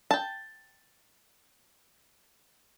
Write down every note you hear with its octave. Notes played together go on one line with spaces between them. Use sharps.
G5 A5